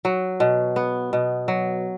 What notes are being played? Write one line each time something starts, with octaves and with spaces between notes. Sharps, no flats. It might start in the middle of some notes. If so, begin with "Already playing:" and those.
F#3
B2
B3
B2
F#3